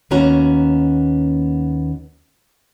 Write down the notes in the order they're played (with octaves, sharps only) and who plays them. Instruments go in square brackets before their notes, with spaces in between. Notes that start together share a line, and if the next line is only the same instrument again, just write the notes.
[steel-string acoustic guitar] D#2 A#3 B3 C#4 F#4 A#5